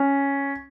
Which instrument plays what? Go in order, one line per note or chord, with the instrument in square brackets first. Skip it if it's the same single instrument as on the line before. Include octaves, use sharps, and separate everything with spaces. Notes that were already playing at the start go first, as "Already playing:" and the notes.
Already playing: [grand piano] C#4